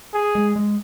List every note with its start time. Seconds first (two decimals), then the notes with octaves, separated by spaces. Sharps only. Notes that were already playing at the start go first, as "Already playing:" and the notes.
0.14 G#4
0.35 G#3
0.56 G#3